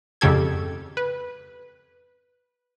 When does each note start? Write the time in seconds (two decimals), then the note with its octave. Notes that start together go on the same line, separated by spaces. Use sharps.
0.21 F2 G#2 C#3 G4 A4 G#6
0.97 B4